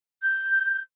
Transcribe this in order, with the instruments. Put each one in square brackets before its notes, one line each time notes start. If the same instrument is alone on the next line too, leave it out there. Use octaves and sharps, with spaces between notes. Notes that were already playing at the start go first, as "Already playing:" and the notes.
[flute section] G6